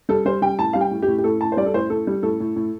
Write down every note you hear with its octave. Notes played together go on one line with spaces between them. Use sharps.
G3 A4
G3 C5
G3 G5
A2 A5
G3 F5
G5
A2
G4
A2
G4
A2 A4
A2 A5
C5
G3 D5
A4
A2 C5
A2 A4
G3
A2 A4
A2
A2